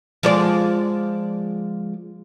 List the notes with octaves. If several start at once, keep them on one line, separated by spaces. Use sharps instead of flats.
F3 G#3 D5